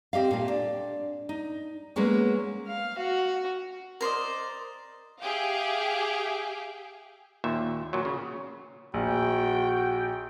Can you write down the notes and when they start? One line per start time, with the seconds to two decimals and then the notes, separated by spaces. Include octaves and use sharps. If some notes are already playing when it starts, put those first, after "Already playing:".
0.13 C4 G4 D#5 F5
0.31 A#2 A3
0.48 D4
1.29 D#4
1.96 F#3 G#3 A#3 B3 C#4
2.67 F5
2.98 F#4
4.01 A#4 C5 D5 D#5
5.22 G4 G#4 E5 F5 G5
7.44 D#2 A#2 E5
7.93 A#2 F#3
8.05 C#3
8.94 A#1 F#4 G5